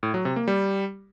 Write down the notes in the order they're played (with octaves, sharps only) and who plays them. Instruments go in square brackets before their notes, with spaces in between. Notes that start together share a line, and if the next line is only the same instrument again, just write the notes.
[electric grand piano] A2
F#3
C3
A#3
G3